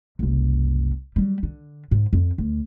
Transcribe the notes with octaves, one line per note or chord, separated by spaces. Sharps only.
F#1 C2
F#3 G3
D3
G#2
F2
D2